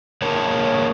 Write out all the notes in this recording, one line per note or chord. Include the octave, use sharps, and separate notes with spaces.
G#3 A#3 A#4 C#5 A5